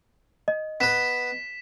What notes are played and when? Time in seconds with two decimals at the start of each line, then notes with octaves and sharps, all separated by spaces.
0.48 D#5
0.80 B3 B4 B6 E7